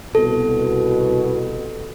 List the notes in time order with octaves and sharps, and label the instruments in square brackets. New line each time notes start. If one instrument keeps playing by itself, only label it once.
[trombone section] C2 B2 [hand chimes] A4